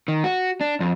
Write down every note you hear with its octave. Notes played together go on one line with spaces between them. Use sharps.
D#3
F#4
D4
F2